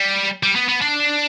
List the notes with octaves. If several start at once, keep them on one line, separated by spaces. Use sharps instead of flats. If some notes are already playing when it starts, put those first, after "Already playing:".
Already playing: G3
G3
B3
B3
D4